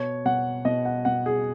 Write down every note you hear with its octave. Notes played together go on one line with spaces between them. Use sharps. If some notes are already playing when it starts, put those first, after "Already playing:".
Already playing: B2 C#5
B2 F#5
B2 D#5
F#5
B2 F#5
G#4